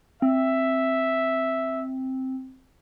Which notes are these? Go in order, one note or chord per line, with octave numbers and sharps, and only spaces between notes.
C4 E5